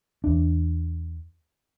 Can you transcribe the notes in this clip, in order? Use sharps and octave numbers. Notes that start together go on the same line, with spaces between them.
E2 D4